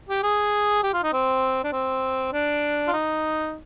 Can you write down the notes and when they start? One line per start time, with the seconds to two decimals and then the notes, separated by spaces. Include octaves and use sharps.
0.09 G4
0.23 G#4
0.83 G4
0.93 F4
1.03 D#4
1.13 C4
1.64 D4
1.72 C4
2.33 D4
2.87 F4
2.93 D#4